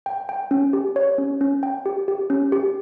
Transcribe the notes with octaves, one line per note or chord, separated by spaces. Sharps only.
G5
G5
C#4
G4
C#5
C#4
C#4
G5
G4
G4
C#4
G4